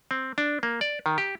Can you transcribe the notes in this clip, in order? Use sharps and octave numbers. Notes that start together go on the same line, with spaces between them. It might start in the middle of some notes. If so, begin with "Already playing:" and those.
C4
D4
A#3
D5
D#3
G4